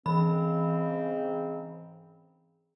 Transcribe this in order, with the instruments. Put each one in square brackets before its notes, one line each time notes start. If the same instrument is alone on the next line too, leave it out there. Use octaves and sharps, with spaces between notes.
[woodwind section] G#2 C#3 C4 [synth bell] E3 B5